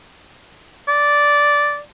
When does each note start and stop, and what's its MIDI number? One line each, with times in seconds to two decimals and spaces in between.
0.88 1.80 74